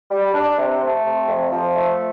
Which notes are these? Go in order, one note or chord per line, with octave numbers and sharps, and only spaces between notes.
G3
D4
C3
A3
C3
F2
F3
A3